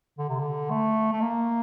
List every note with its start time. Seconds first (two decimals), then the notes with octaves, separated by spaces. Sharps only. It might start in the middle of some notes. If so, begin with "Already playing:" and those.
0.19 D3
0.29 C3
0.39 D3
0.70 A3
1.13 A3
1.22 A#3